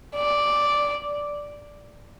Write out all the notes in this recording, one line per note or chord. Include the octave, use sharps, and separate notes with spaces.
D5